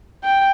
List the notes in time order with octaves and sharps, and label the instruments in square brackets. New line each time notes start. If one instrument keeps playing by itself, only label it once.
[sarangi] G5